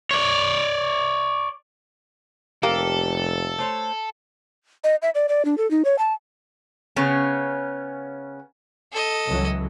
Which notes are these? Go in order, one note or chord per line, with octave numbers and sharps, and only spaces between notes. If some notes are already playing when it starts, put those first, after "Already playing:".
C#5 D5
F1 A#3 G4 A4
A3 C5 C#5
D#5
E5
D5
D5
D4
A4
D#4
C#5
A5
C#3 B3 C#4
A4 D#5
C#2 E3 F#3